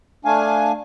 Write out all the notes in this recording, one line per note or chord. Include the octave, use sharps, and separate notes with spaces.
A3 D4 F5 G#5